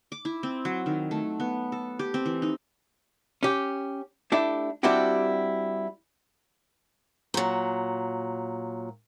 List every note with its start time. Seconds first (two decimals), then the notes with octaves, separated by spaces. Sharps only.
0.12 D6
0.25 E4
0.43 C4
0.65 F#3
0.86 D#3
1.11 A3
1.40 B3
1.72 A4
1.99 G4
2.14 C4
2.26 E3
2.42 D#4
3.43 C#4 G4
4.32 A3 D4 E4 G4
4.83 G3 C4 D4 E4 F#4 G4
7.34 A#2 F#3